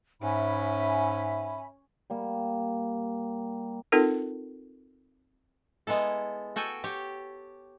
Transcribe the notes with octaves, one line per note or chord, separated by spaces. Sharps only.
G#2 C#4 E5 G#5 B5
G3 A#3
C4 D#4 F4 A4 A#4
G#3 B3 E4 A4
F#4 A4 G5 G#5
G4 C#5